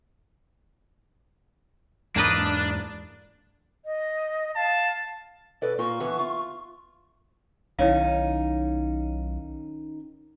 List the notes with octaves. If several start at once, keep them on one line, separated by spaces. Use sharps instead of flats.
E2 G#2 A#3 D4 B4 D#5
D#5
F5 A5
B2 A4 B4 D5
A#2 A#3 F4 C#6
D3 E3 B3
F4
B1 D#3 C#4 D#4 E4 C#5 F5